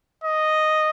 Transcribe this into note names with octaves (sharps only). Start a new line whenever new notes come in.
D#5